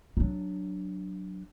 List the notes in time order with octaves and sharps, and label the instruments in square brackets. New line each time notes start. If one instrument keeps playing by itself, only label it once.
[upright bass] F#3 D4